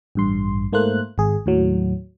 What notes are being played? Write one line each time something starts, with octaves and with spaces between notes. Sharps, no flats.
A1 G2 C6
G#2 A3 A#3 C5 F#6
G#1 G#4
D#2 A2 F#3